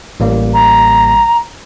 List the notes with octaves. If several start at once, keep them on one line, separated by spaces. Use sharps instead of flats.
A1 G3 A#3
A#5